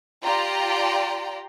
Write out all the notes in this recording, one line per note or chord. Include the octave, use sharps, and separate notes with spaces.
F4 G4 D5 G5 A#5 C6